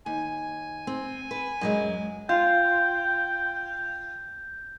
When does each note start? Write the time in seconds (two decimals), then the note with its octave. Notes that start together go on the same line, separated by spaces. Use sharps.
0.06 D#2 G#5
0.87 C4
1.31 B4
1.61 F#2 F#3 G#3
2.29 F4 G5 G6